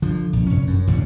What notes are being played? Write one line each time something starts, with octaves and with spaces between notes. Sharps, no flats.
D3 F3
A#1
F1 C#4
F#2
E1 A1 C#3